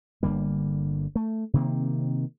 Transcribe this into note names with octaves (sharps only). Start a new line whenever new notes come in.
G1 D3 G3 A#3
A3
C3 D#3 A#3 C4